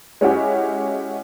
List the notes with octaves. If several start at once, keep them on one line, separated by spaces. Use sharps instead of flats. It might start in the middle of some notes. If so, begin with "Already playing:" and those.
G#3 C#4 E4 F#4 G4